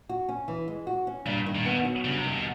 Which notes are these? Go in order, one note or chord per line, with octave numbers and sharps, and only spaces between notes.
F#4
C#4
E3
G#3
F#4
C#4
G2 A#2
D#3
A#2
B2 B3
F#3
G2 C#3
C3
D#3
B2